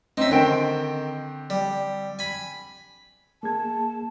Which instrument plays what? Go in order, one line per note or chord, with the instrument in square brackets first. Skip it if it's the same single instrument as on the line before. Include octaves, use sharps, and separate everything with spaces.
[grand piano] C4 C#4 [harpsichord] D#4 E5
[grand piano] D3 C4 G5 [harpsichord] D#3
[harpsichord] G3
G#5 B5
[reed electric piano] A#3 G#4 G#6 [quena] A5